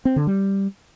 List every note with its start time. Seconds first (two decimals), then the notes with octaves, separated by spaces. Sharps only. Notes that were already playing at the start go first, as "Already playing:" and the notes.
0.05 C4
0.16 D3
0.27 G3